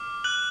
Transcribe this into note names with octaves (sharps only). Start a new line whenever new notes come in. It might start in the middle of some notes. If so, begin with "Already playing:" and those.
Already playing: D6 F6
F#6 F#7